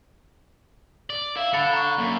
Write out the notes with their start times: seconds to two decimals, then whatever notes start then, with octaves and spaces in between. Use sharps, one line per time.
1.10 D5
1.37 E4 F5
1.54 D3 B5 A6 C#7
1.73 A#5 C#6
1.98 F#2 A#3